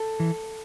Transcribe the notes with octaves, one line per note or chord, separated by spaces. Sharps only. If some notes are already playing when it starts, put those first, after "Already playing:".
Already playing: A4
E3